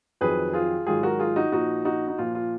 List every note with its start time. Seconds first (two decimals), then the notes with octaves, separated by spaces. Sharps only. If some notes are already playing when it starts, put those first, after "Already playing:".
0.21 F2 D#3 F#3 G#4 B4
0.53 F4 G#4
0.86 G#2 D#3 F#3 F4 G#4
1.03 F#4 A#4
1.19 F4 G#4
1.36 D#4 F#4
1.52 A#2 F3 D#4 F#4
1.85 D#4 F#4
2.08 D#4
2.18 A#2 F3 F4
2.35 F4